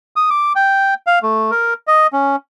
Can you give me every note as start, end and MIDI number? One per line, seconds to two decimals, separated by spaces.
0.16 0.30 87
0.30 0.53 86
0.56 0.94 79
1.07 1.19 77
1.23 1.51 57
1.51 1.74 70
1.87 2.07 75
2.13 2.36 61